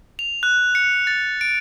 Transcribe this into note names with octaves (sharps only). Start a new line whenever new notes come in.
F7
F#6
C#7
A6
D7